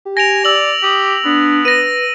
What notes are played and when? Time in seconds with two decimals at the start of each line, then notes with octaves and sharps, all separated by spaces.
0.05 G4
0.17 G#5 A#6 D7 F7
0.45 D5 E6 F#7
0.83 G4 D#6
1.25 B3 D4
1.65 B4 A#6 D#7